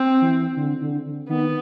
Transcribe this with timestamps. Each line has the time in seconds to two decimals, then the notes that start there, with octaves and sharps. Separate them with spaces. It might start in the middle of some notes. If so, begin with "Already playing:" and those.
Already playing: C4
0.21 E3
0.56 D3
0.81 D3
1.29 D#3 B3